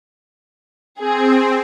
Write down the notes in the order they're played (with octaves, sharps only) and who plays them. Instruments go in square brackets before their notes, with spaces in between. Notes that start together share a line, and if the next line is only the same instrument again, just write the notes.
[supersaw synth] C4 [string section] G#4